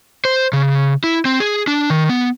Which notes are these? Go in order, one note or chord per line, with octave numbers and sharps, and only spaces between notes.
C5
C#3
E4
C4
G#4
D4
D#3
B3